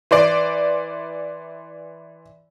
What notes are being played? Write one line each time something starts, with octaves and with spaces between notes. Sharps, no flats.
E3 C5 D5